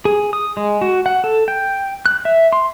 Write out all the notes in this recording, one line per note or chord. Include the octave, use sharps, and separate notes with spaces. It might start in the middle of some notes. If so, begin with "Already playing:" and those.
G#4
D#6
G#3
F#4
F#5
A4
G5
F#6
E5
C6